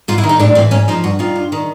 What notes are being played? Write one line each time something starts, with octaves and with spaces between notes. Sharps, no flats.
G#2 F4
E4
D#3
D#4
A2 D4
E3 C4
G#2 C#4
F3 D#4
G2 F#4
D#3 F4
G2
D#3